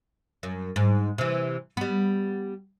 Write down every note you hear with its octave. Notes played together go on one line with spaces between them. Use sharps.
F#2
G#2
C3 E3
G3 B3